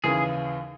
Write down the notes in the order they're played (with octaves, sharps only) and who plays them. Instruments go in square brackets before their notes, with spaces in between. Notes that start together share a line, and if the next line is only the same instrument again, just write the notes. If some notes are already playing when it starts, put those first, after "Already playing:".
[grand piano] D#2 C#3 E3 [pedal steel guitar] G#4